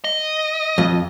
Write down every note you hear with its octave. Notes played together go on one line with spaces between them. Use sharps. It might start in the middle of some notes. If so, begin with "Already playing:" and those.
D#5
F2